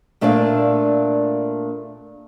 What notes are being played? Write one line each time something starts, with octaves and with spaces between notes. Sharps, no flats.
A#2 A3 D4 A4 D5 F5